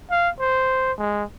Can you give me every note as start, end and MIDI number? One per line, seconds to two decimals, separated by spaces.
0.11 0.29 77
0.40 0.93 72
0.98 1.24 56